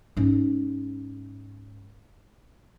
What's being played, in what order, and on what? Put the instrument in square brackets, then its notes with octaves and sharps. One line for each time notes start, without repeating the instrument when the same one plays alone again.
[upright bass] G#2 C#4